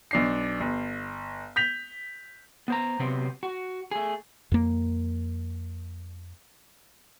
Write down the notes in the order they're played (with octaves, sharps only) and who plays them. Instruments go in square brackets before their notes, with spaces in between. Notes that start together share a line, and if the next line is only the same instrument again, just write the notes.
[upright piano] B1 D4 C7
G1
G6 B6 F7
[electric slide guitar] B3 C5 A#5
C3 F#3 B3 C4 G4
F#4
A3 G#4
[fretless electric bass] F2 A#3